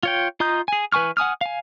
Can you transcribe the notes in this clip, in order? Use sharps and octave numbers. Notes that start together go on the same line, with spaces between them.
F4 C#5 G5
F4 D#5 A#5 D#6 G6
G#4 G#5
E3 B4 G#5 C#6 F6
F#5 G#5 D#6 F6
F5 G#5